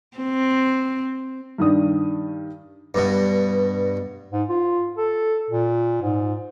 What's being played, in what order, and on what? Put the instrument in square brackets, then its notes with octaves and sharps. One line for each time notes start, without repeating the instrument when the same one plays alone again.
[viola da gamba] C4
[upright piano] G2 D#3 D4 D#6
[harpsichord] G2 B2
[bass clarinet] G#2
F4
A4
A#2
G#2